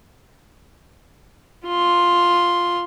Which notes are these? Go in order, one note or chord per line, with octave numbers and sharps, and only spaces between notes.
F4 C6